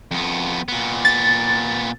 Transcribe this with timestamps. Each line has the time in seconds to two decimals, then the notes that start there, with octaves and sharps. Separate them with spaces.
0.11 F2 B3
0.68 A#2 B3
1.05 A6